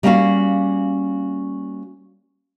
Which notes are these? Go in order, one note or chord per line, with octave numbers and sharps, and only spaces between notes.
G3 A#3 C#4 D#4 F#4 F5